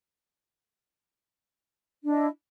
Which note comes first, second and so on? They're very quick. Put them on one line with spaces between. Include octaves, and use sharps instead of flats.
D4 D#5 E4